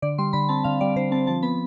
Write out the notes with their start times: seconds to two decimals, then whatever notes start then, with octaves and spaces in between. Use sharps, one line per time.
0.02 D3 D5
0.18 G3 C6
0.33 D3 B5
0.49 C4 A5
0.64 D3 F5
0.81 G3 D5
0.96 D3 C5
1.11 C4 A5
1.27 F3 A5
1.43 B3 B5